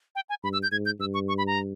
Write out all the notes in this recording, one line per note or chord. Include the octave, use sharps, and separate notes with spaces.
G5
G#5
G2 B5
E6
G6
G#2 G#6
G6
G2 E6
C#6
C#6
B5
A#5